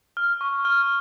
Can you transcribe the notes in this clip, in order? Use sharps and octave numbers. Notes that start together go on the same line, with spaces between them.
F6
C#6
F6